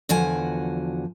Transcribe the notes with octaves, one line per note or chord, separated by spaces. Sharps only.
E2 D3 F3 F#4 G#5